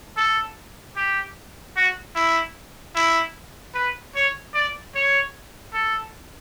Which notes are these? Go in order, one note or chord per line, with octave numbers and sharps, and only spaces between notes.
A4
G4
F#4
E4
E4
B4
C#5
D5
C#5
A4